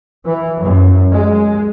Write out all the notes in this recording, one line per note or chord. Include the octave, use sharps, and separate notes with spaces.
E3
F#2
G#3